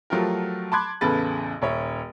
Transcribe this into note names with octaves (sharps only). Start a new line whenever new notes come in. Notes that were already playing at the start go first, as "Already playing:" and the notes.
F3 F#3 A3 F4 G4 A#4
A5 B5 C6 D6 F#6 G#6
A1 E2 C#3 A4 B4 A6
D#1 C#5 E5